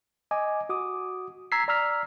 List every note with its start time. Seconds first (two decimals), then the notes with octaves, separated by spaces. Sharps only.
0.31 D#5 G#5 D6
0.69 F#4 D6 D#6
1.52 A#5 E6 G#6 B6 C7
1.68 D5 A#5 E6 F6 B6